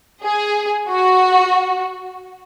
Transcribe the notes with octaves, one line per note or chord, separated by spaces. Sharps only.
G#4
F#4